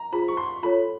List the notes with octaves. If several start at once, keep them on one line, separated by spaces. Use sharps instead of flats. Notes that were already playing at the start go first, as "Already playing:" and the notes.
Already playing: A#5
F4 G#4 C5 B5
C#6
C6
F4 A4 C#5 B5